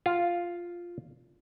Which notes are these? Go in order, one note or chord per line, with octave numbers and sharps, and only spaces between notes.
F4